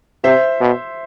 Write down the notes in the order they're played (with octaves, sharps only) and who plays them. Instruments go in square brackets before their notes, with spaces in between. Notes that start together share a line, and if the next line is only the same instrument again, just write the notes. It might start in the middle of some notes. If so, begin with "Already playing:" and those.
[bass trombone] C3 [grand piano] C5 E5
[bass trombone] B2